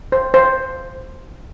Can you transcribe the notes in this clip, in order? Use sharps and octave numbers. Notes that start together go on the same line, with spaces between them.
C5
C5